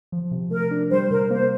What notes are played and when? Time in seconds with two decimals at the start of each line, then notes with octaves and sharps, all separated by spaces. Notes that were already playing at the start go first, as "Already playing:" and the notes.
0.12 F3
0.31 C3
0.51 A3 A#4
0.71 D4
0.91 G3 C5
1.10 C3 A#4
1.30 A#3 C5